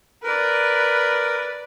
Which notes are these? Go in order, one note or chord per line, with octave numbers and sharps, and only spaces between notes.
A#4 B4 D5